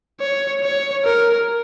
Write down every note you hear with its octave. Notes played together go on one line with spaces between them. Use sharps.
C#5
C#5
A#4